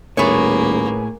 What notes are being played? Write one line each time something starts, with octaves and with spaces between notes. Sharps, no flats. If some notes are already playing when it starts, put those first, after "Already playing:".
D#1 A2 A#3 B3 G#4 C#5